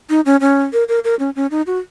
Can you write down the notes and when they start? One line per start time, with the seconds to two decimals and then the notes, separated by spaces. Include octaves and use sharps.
0.10 D#4
0.26 C#4
0.41 C#4
0.73 A#4
0.88 A#4
1.04 A#4
1.19 C#4
1.36 C#4
1.51 D#4
1.67 F#4